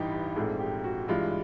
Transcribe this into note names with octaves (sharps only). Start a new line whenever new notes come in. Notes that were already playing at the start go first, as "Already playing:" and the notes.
Already playing: A1 G2 E3 D#4 G4
G4
A#1 G#2 F3 A3 C4 G#4
G4
F#4
G2 E3 G#3 F4